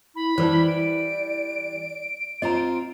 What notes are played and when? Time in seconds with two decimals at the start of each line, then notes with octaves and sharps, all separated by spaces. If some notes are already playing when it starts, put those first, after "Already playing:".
0.16 E4 B5
0.38 E3 G3 E4 B4 C5 D5
0.67 D7
2.42 C4 F4 C5 D#5 A#5